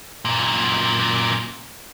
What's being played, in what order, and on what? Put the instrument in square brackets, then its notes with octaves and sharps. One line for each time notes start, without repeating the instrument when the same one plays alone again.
[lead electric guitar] F#2 A#2